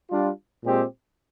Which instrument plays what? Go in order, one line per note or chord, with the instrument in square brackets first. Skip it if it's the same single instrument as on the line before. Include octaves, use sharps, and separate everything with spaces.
[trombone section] G3 D4 F4
A#2 G#3 C4 G4